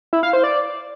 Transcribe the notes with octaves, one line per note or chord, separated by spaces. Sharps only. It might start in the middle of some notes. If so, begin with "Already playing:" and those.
E4
F5
C5
D5